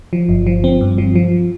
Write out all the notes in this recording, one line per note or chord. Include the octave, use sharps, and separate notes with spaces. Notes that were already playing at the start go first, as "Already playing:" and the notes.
F3
G1
F3
C4
G2
F3
F3